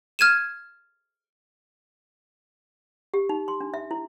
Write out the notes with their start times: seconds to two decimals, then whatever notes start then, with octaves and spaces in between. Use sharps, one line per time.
0.19 F6 G#6 D#7 E7
3.14 G4
3.29 D#4
3.48 C6
3.61 D4
3.74 E5
3.91 E4